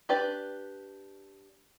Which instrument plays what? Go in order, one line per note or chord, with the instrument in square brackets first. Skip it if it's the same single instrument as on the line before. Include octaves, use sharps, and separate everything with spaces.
[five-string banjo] D4 G4 B4 D5